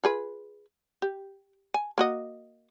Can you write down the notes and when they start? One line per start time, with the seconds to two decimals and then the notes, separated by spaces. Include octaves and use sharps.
0.04 F4 G#4 B4
1.02 G4
1.74 G#5
1.98 A#3 F#4 D#5